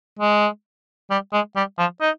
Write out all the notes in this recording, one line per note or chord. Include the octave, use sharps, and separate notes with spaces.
G#3
G3
G#3
G3
F3
D#4